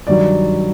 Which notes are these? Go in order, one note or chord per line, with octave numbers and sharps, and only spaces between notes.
G2 D#3 F#3 D5